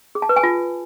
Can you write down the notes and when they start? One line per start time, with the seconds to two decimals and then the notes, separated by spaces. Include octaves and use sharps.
0.15 G#4
0.22 A5
0.29 B4
0.36 G#5
0.43 F4